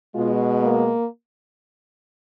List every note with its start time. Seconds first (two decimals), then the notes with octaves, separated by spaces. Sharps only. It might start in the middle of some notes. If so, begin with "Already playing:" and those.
0.14 B2 G#3 F4
0.62 A#3